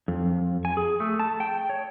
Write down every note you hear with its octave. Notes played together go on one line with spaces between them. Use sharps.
F2
G#5
G#4
A3
A5
G5
C#5